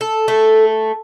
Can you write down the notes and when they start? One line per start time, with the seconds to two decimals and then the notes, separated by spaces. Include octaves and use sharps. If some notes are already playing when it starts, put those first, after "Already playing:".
0.01 A4
0.28 A3